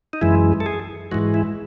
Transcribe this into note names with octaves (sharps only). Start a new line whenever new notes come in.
D#4
F#2 E3 G#3 E4
A4
G#4
G#2 E3 G#3 F#4
E4